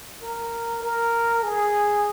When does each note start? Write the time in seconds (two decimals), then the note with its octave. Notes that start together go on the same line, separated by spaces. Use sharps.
0.22 A#4
0.82 A#4
1.43 G#4